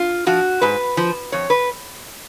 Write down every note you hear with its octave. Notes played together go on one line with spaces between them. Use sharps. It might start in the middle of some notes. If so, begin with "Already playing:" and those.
Already playing: F4
F3 F#4
G#2 B4
F3
F2 C#5
B4